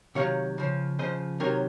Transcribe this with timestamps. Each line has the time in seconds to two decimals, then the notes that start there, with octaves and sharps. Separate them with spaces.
0.15 C3 D#3 F#3 C#5 F5
0.58 C#3 F3
0.99 C#3 F3 C5 D#5
1.40 C3 D#3 F#3 A#4 C#5